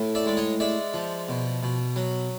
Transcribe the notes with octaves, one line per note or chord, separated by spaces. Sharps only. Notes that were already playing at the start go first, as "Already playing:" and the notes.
Already playing: A2
D5 E5
G#3 D5
C#5 D#5
G#3 D5 E5
F3
B2
B2
F#3